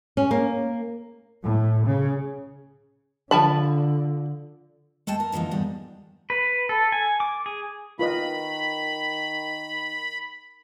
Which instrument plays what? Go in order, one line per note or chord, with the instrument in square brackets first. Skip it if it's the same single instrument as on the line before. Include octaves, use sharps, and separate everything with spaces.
[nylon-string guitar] C#4
A#3
[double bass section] A2
C#3
[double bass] D3 [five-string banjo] F3 A5 B5
[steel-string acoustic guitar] G#3 A3 G5 A5
A#4
D3 E3 F3 A#3 D#4
E2 G#2 G3
[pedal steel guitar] B4
A4
G#5
D6
G#4
[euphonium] D#3 [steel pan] F4 B4 D#5 [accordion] B5